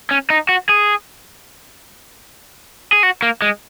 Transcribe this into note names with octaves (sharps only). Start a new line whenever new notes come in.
C#4
D#4
F#4
G#4
G#4
F#4
A#3
G#3